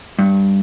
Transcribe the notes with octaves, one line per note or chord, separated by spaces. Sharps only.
G2